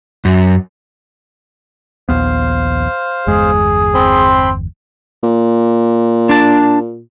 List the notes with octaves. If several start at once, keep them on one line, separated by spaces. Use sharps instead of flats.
F#2
A#1 D#2 B3 C5 F5
G1 E2 G#3 G#4
C4 B5 C6
A#2
D4 A5